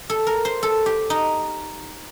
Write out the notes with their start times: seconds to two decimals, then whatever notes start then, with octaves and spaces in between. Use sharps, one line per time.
0.10 A4
0.27 A#4
0.45 C5
0.63 A4
0.86 G4
1.10 D#4